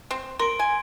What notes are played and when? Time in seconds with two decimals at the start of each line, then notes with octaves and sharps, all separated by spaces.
0.11 C4
0.39 A#4 C6 D7
0.59 G#5